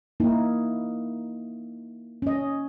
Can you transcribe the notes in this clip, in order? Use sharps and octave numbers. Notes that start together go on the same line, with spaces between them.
A#3 D#4 E4
C#4 D#5